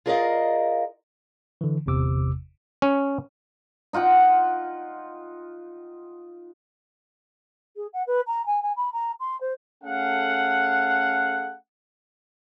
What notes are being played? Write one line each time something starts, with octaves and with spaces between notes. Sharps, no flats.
F4 G#4 A#4 D5 D#5 F5
D3 E3
G1 E2 C3 D6 E6
C#4
D#4 F4 F#5 G5
G#4
F#5
B4
A#5
G#5
G#5
B5
A#5
C6
C5
A3 C#4 G#4 A4 F5 F#5